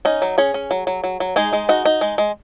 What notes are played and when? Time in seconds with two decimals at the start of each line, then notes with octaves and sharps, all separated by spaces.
0.05 C#4 D#4
0.22 F#3
0.38 C#4 G#4 C#5
0.54 C#4
0.71 F#3
0.87 F#3
1.04 F#3
1.20 F#3
1.36 G#3 D#4 G#4
1.53 G#3
1.69 D#4 F#4
1.85 D#4
2.01 G#3
2.18 G#3